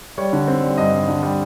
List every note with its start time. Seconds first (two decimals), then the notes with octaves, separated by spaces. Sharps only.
0.18 G3 C#5
0.33 D3
0.47 C4
0.63 G3
0.78 G2 D#5
0.93 D3
1.08 D3
1.23 G3